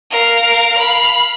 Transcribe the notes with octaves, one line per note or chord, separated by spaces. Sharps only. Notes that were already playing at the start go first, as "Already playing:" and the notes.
A#4 F5
F5 B5